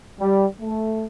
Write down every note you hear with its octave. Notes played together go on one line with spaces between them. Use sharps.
G3
A3